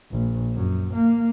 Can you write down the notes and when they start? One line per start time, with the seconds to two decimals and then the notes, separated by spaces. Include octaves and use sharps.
0.12 A#1
0.55 F#2
0.94 A#3